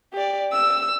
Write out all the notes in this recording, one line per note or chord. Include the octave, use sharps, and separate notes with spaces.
G4 D5
E6